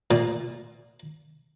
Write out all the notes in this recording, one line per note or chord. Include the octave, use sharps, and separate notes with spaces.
A#2